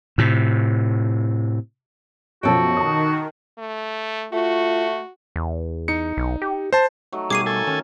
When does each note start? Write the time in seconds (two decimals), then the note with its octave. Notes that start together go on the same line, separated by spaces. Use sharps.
0.18 A2 C3
2.43 F#2 B2 F3 F#4 A4 G5
2.77 D#3 A5 D#6
3.58 A3
4.33 A3 F4 F#4
5.36 E2
5.88 D#4 C#7
6.17 B1
6.42 G4
6.73 C5 A5
7.12 F#3 A3 D#4
7.30 B2 D#3 G3 G#4 D6 C7 D#7
7.46 A4 G#5
7.67 D#3 C#4